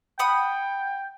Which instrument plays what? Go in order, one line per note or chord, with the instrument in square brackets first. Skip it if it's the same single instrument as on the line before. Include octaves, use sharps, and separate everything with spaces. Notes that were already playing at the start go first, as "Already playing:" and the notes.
[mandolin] F#5 B5 D#6 [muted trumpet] G5